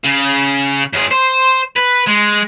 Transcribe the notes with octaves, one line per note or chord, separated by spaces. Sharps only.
C#3
F#2 G#4
C5
B4
G#3